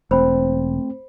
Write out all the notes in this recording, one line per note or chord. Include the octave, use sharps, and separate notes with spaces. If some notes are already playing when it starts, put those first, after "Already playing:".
E1 A3 C4 C5 B5